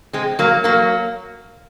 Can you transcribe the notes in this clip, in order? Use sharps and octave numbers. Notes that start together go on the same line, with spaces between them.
G#3 C4
F#3 A#3
F#3 A#3